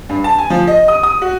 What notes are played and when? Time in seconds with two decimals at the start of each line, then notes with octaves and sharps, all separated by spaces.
0.09 G2
0.24 A5
0.38 G#5
0.50 F3
0.67 D#5
0.88 D#6
1.03 D#6
1.22 F#4